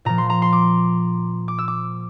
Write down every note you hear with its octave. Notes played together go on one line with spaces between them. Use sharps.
A#2 F3 A#5
C6
A#5
C6
D6
D6
E6
D6